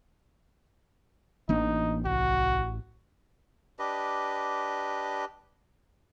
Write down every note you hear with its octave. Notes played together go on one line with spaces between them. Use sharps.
A1 E3 A#3 D4 D#4
C2 F#4
D4 G4 B4 D#5